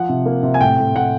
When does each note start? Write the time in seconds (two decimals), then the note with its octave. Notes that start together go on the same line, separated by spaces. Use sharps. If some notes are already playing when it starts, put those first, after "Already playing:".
Already playing: F3 F#5
0.09 C3
0.26 A#3
0.43 C3
0.54 G#5
0.60 A2 G5
0.78 A2
0.95 A2 F#5